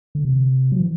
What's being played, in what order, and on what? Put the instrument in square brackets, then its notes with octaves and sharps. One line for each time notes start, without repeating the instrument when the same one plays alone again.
[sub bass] D3
C3
F#3
E3